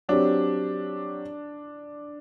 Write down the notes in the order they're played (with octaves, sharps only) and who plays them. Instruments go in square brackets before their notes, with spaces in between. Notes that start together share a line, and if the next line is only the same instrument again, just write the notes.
[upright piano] F#3 C4 G4 [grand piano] D4